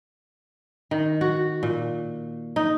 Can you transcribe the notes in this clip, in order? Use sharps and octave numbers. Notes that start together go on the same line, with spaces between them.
D#3
F#4
A#2
D#4